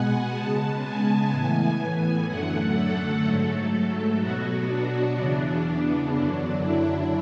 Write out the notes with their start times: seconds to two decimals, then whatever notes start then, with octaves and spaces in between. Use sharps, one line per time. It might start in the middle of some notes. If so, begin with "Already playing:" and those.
Already playing: B2 G#3 B3 F#5 G#5
0.34 C#3 G#3 B3 A5
0.82 G#5
1.31 A2 E3 B3
1.79 G#5
2.26 F#2 D3 F#3 A3 F#5
2.75 A4
3.23 G#2 F#3 A3 A4
4.19 B2 F#3 B3 F#4
4.66 D4
5.15 E2 C#3 E3 B3 D4
6.11 F#2 D3 F#3
6.59 E4